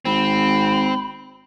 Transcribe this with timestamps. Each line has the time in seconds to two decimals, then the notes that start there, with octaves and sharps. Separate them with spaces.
0.05 G#1 C4 B5